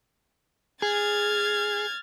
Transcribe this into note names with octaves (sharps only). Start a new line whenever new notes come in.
G#4 F6 G#6 A6